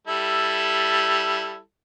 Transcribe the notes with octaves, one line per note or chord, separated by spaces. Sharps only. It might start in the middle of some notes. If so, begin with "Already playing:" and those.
G3 E4 A4